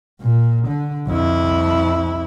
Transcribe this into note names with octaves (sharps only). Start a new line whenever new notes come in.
A#2
D3
F2 E4